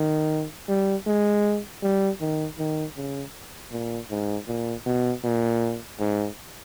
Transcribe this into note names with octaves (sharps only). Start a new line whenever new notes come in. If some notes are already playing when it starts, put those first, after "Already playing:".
Already playing: D#3
G3
G#3
G3
D#3
D#3
C#3
A#2
G#2
A#2
B2
A#2
G#2